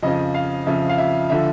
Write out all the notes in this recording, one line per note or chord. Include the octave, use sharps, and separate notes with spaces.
F2 C#3 F3 D#5
F5
F2 C#3 F3 E5
F5
E5
D3 F3 E5